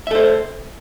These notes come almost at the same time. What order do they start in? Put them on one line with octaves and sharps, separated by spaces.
E5 A4 C5